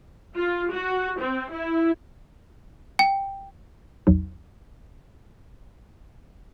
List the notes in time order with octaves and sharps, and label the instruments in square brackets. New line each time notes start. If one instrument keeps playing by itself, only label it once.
[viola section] F4
F#4
C4
E4
[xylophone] G5
[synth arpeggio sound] A#1 E2 F#3 D#4